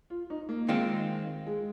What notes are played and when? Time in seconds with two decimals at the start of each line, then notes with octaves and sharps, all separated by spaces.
0.10 F4
0.30 D#4
0.49 A#3
0.69 D#3 G#3 C4 F4
1.46 G#3